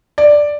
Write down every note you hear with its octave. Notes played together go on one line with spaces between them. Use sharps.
D5